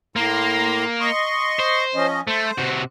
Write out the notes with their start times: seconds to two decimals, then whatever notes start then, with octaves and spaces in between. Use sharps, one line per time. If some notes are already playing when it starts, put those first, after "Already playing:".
0.16 A2 A#3 A#5 C6
1.00 D#5 C6 C#6
1.59 C5
1.95 F3 C#4 D#5
2.27 A3 C5
2.58 C3 F#4